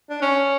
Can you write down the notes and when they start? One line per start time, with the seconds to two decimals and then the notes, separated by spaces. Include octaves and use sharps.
0.10 D4
0.22 C#4